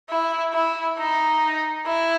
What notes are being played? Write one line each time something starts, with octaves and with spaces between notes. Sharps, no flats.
E4
E4
D#4
E4